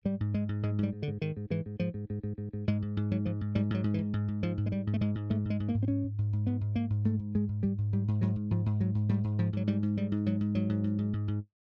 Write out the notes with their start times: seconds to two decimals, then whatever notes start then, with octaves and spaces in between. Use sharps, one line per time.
0.05 G#2 G3
0.20 G#2
0.34 G#2 G#3
0.49 G#2
0.63 G#2 G#3
0.78 G#2 G3
0.93 G#2
1.02 D3
1.08 G#2
1.21 G#2 D#3
1.37 G#2
1.50 G#2 E3
1.66 G#2
1.80 G#2 F3
1.94 G#2
2.10 G#2
2.23 G#2
2.38 G#2
2.53 G#2
2.68 G#2 G#3
2.82 G#2
2.97 G#2
3.11 G#2 F#3
3.25 G#2 F3
3.41 G#2
3.55 G#2 G3
3.70 G#2 F#3
3.84 G#2
3.94 E3
3.98 G#2
4.13 G#2
4.28 G#2
4.43 G#2 F3
4.58 G#2
4.66 G#3
4.72 G#2 G3
4.87 G#2
4.94 A3
5.01 G#2 G#3
5.15 G#2
5.30 G#2 A3
5.45 G#2
5.50 G#3
5.60 G#2
5.69 A#3
5.74 G#2
5.83 C4
5.88 G#2 C#4
6.04 G#2
6.18 G#2
6.33 G#2
6.47 G#2 B3
6.61 G#2
6.75 G#2 A#3
6.90 G#2
7.05 G#2 A3
7.19 G#2
7.35 G#2 G#3
7.49 G#2
7.63 G#2 G3
7.78 G#2
7.93 G#2 G3
8.08 G#2
8.21 G#2 F#3
8.36 G#2
8.51 G#2 F3
8.66 G#2
8.80 G#2 F#3
8.95 G#2
9.09 G#2 G3
9.24 G#2
9.38 G#2 F3
9.53 G#2 F#3
9.67 G#2 G3
9.83 G#2
9.97 G#2 G3
10.12 G#2
10.26 G#2 F#3
10.41 G#2
10.55 G#2 F#3
10.69 G#2
10.84 G#2
10.98 G#2
11.13 G#2
11.28 G#2